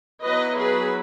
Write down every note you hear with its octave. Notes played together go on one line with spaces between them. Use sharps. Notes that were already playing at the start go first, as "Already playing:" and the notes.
F#3 B3 E4 B4 D#5
G#4 B4